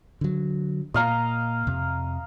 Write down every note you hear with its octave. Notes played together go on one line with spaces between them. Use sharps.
D3 F#3
A#2 A#3 D#5 F5 A#5
F2 C3